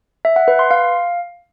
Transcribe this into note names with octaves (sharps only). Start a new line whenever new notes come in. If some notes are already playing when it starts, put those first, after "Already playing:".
E5
F#5
B4
C6
F5